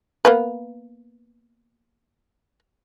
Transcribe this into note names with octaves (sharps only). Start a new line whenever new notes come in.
A#3 B3 B4